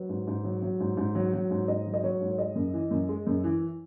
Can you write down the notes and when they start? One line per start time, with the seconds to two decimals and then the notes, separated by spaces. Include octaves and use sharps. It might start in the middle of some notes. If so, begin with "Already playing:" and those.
Already playing: F#3 B4
0.09 G#2
0.27 G#2
0.44 F#3
0.62 F#3
0.80 G#2
0.97 G#2
1.15 F#3
1.34 F#3
1.51 G#2
1.68 G#2 D#5
1.86 F#3
1.94 D#5
2.03 F#3 C#5
2.21 G#2
2.31 C#5
2.38 G#3 D#5
2.56 F#2
2.74 E3
2.91 F#2
3.09 G#3
3.27 F#2
3.44 E3